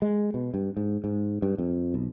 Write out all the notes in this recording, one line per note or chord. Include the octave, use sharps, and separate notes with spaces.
G#3
B2
G2
G#2
G#2
G2
F2
B1